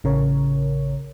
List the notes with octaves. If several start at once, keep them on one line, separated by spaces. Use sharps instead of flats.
A1 C#3 A#4 C#5